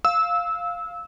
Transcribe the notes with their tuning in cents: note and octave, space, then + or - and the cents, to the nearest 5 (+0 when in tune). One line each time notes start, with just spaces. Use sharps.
F5 +0 E6 -20